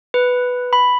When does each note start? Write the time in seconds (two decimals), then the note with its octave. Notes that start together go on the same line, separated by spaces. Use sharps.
0.14 B4
0.73 B5